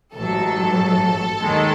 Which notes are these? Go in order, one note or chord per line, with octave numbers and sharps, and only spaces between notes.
A1 G#2 F#3 A4
D#2 D#3 G#3